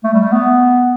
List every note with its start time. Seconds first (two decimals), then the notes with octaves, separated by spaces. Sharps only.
0.04 A3
0.14 G3
0.23 A3
0.32 B3